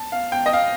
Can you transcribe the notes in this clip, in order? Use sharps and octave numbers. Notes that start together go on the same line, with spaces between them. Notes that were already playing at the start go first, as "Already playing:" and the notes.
Already playing: A5
F5
G5
D#5
F5